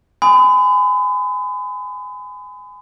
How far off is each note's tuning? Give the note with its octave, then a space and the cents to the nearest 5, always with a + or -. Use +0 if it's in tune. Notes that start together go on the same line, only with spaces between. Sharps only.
G#5 +0 B5 +40 D#6 -5